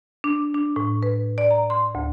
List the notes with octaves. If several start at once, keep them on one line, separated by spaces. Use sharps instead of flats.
D4
D4
A2
B4
D5
A#5
C6
D2